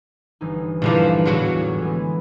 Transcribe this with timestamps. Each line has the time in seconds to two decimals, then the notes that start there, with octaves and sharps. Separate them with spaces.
0.41 G1 E3 D#4
0.82 G2 A#2 D3 E3 F3 G4
1.25 E2 A2 F#3 F4 F#4
1.55 A1 A2
1.82 E3 G#3 B3